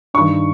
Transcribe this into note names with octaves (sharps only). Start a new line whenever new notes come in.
G2 D#3 C#6